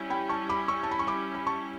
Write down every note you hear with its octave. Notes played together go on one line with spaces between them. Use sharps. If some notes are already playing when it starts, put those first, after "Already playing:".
Already playing: G3 C#4 E4
G5 B5
A5 C#6
B5 D6
C#6 E6
A5
B5
C#6
B5 D6
B5
A5 C#6